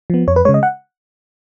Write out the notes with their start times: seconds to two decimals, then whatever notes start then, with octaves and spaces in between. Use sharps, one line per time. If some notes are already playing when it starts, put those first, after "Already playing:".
0.10 F3 B3
0.28 F2 C#5
0.36 B4
0.45 C#3 G#3 C#5
0.54 D#5
0.63 F#5